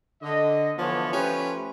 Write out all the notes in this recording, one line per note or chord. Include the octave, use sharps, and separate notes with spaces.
D3 D#5
D3 E3 F3 B3 C#5
F3 A3 C#4 G4 B4